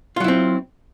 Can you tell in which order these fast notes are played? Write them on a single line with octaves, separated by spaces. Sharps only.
F4 F#3 E4 C4